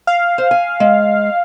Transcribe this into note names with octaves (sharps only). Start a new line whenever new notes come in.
F5
C5
G#5
G#3